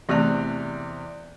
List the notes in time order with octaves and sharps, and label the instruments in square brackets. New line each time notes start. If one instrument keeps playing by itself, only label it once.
[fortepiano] E2 C3 F#6 [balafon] E3 A3 A5 [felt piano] D5